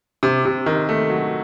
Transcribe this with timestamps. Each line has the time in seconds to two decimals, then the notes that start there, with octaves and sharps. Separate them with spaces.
0.23 C3
0.45 C3
0.66 D#3
0.89 A3
1.10 F#3